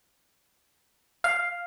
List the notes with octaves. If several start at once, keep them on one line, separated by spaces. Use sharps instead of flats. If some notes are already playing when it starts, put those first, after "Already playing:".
F5